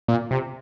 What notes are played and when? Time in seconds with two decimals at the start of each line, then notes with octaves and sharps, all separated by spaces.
0.08 A#2
0.31 C3